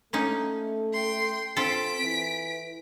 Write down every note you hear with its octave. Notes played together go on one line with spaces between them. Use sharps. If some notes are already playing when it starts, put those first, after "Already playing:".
A3 A#3 C#4 D#4
G5 C6
C4 F4 A4 B6 D7
E3